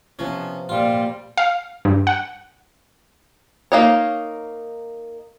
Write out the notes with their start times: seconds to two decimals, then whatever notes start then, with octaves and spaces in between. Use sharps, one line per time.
0.19 C3 F3 B3 C#4
0.69 A#2 G3 F4
1.37 F5
1.85 G2
2.07 F#5
3.72 A#3 D#4 C#5